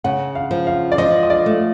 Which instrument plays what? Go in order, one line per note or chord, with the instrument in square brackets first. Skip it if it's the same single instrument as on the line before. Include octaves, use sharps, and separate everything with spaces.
[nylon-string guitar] C#3 [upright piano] F#5
[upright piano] F5
[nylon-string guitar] F3
[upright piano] F5
D5
[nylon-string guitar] F3 [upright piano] D#5
[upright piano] D#5
D5
[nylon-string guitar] A3